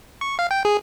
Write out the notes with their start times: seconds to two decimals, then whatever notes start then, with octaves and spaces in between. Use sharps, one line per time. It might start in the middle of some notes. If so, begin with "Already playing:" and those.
0.21 C#6
0.39 F5
0.51 G5
0.65 G#4